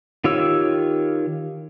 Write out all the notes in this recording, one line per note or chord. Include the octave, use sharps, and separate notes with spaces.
D#3 F4 G4 C#5 E6